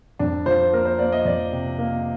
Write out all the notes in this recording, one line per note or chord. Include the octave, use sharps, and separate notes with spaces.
F2 D4
F3 C5
A#3 A#4
C5
A#3 D5
D#5
F2 D5
C3
A#3